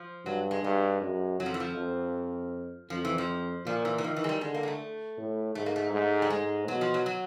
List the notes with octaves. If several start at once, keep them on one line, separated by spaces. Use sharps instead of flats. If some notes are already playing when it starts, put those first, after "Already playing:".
Already playing: F3
G2 F#3
G#3
G2 G#3
F#2
F2 F#3
F3
E3
F3
F2
F2 F3
E3
F3
A#2 F3
E3
E3
D#3 F3
E3
G#3
G3
D3 G#3
A#3
G#3
A3
A2
G#2 A3
A#3
A3
G#2
G3
G#2 G#3
B2 F#3
F3
F#3
F#3